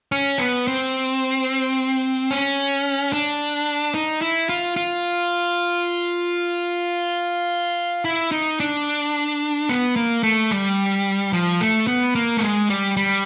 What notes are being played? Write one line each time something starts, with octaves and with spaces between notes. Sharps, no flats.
C#4
B3
C4
C#4
D4
D#4
E4
F4
F4
E4
D#4
D4
B3
A#3
A3
G3
F3
A3
B3
A#3
A3
G#3
G3
G3